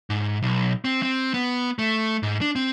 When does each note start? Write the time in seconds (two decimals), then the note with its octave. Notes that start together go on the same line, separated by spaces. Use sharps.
0.10 G#2
0.42 B1
0.85 C4
1.03 C4
1.34 B3
1.79 A3
2.23 G#2
2.41 D4
2.56 C4